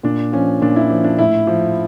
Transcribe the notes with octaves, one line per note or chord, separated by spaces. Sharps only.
A#2 D4
F3 C#4
A#2 D4
E4
F3
D4
A2 E4
F3